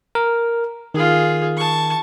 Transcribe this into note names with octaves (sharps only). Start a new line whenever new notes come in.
A#4
D#3 F4 G#4
A5 C#6